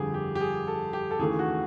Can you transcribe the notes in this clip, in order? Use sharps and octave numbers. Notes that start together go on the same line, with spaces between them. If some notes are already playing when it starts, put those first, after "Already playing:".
Already playing: G1 F2 D3 G3 G4 G#4
G4
G4
G#4
A4
G4
A4
D#2 C#3 E3 A3 G#4
F#4